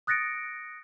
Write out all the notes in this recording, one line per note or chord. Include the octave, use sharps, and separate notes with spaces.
D#6 F#6 A6 A#6 C#7 D7